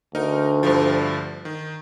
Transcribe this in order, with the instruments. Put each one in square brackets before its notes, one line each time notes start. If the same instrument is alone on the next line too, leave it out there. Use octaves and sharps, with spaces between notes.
[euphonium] D2 [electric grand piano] D#4 A#4
[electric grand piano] G2 D3 F3
D#3